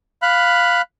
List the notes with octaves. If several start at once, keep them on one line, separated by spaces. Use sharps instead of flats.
F5 B5 F#6